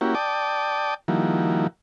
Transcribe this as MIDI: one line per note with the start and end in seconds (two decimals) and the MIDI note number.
0.01 0.14 58
0.01 0.14 61
0.01 0.14 64
0.01 0.14 66
0.01 0.14 67
0.15 0.94 74
0.15 0.94 79
0.15 0.94 81
0.15 0.94 86
0.15 0.94 87
1.08 1.67 51
1.08 1.67 53
1.08 1.67 55
1.08 1.67 58
1.08 1.67 64
1.08 1.67 66